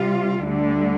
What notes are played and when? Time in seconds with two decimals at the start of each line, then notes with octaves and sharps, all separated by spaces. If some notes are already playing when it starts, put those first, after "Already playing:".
Already playing: C3 G3 F4
0.43 D2 D3 G3